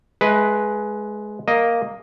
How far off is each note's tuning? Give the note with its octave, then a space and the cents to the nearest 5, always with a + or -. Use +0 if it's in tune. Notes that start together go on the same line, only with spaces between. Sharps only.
G#3 +15 B4 +0 E5 +0
A#3 +0 D#5 +0